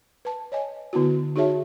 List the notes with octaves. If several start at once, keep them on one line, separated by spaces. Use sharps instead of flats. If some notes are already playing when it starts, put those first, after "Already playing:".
B4 A5
C#5 D#5 G#5
D3 B3 E4 F#4
D#4 F#4 G#4 C#5 E5 A5